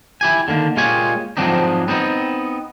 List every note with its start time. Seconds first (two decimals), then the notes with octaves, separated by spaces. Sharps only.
0.21 E4 G4 G#5
0.48 D3 D#3 A#3
0.77 A#2 G#3 F4 G4 C#5 G#5
1.37 G#2 F3 F#3 C4 D4 D#4
1.88 B3 C4 D#4